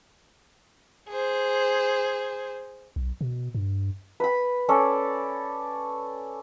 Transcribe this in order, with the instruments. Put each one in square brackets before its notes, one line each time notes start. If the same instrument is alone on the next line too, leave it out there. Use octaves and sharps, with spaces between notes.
[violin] G#4 C5
[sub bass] B1
B2
G2
[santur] B4 B5
C#4 A4 D5